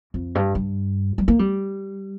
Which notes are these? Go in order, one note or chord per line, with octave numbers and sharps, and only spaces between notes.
F2
G2
G2
G3
A#3
G3